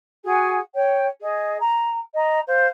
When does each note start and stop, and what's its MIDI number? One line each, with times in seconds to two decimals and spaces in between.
0.24 0.58 66
0.24 0.58 68
0.24 0.58 78
0.24 0.58 80
0.73 1.05 73
0.73 1.05 79
1.21 1.56 68
1.21 1.56 75
1.60 1.98 82
2.14 2.40 75
2.14 2.40 82
2.47 2.67 72
2.47 2.67 77